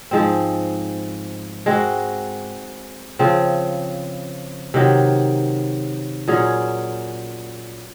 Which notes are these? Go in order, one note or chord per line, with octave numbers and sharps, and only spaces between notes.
G#2 F3 G#3 C4
G#3 C4 F#4 A#4
C#3 F3 C4
C3 D#3 F#3
A#2 F#3 C#4 G#4